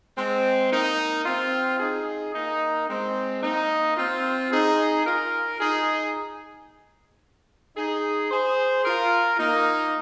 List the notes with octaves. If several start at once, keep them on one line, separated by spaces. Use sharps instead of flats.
G#3 C4
A#3 D#4
C4 F4
D#4 G#4
A#3 D#4
G#3 C4
A#3 D#4
C4 F4
D#4 G#4
F4 A#4
D#4 G#4
D#4 G#4
G#4 C5
F4 A#4
A#3 D#4